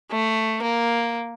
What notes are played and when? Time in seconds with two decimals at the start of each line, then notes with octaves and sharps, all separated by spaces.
0.11 A3
0.62 A#3